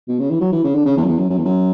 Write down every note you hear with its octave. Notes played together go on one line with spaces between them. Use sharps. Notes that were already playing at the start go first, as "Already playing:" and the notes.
B2
C#3
E3
F#3
E3
C#3
D3
C#3
E2
F#2
E2
F#2
F#2
E2
F#2